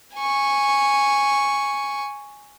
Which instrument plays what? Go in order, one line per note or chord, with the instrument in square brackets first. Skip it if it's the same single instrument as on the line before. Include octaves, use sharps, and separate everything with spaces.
[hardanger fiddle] G#5 C#6